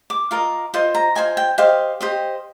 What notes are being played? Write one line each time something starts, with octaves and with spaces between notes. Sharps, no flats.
D6
F4 A#4 D#5
F4 C5 D#5 C6
A#5
F4 C5 D#5 G#5
G5
G4 C5 D#5 F5
G4 C5 D#5